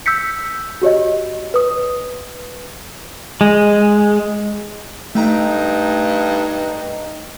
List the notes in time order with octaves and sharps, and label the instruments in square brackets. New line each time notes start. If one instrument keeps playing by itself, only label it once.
[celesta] E6 G6 B6 C#7
F#4 G4 C#5 D#5
B4 D#6
[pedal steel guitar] G#3
[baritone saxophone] G2 [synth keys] A3 G5 A#5 [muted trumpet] D#4